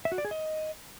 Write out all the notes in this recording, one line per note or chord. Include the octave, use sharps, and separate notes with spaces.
E5
F#4
D5
G#4
D#5